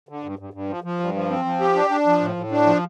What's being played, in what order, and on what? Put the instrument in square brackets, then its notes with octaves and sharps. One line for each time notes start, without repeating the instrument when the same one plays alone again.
[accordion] D3
G2
G2
G2
F3
F3
G2
F3
C4
F3
G4
D4
D4
F3
A2
A2
D4
F3